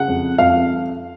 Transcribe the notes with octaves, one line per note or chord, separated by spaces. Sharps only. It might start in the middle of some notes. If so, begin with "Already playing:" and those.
Already playing: C#3 F#5
F2
F2 F5